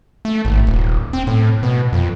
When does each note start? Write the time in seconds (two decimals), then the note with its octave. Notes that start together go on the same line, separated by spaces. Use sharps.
0.25 A3
0.45 G#1
0.67 D#1
1.13 C4
1.27 A2
1.63 B2
1.93 F2